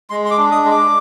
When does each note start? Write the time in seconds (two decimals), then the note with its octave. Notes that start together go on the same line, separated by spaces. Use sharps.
0.10 G#3 C6
0.25 C6
0.31 D6
0.38 D4
0.52 D#6
0.65 G#3
0.71 D6